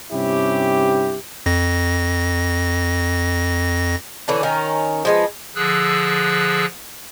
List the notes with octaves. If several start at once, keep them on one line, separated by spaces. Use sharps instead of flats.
G2 C3 C#4 E4 G4
F2 A#6
D3 E3 C#4 D4
D#3 C#4 A#4
F3 G#3 B3
D3 F3 G#4 E6 F#6